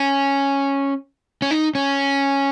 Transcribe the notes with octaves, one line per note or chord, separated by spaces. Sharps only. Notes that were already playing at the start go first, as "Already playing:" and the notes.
Already playing: C#4
C#4
D#4
C#4